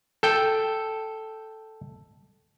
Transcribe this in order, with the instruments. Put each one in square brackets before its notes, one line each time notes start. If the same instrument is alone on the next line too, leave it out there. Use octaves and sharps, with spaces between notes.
[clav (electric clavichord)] A4 G5